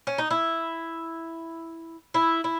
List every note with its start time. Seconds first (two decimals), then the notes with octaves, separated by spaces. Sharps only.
0.07 C#4
0.18 D#4
0.31 E4
2.14 E4
2.44 E4